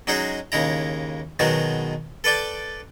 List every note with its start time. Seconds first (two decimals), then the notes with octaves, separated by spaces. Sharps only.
0.07 F#3 G#3 C#4 D#4 F#4 G#4
0.52 D#2 C#3 G#3 E4 A#5
1.39 B2 D#3 F#3 G#3 B3 F#4
2.24 A4 B4 D5 G5 A5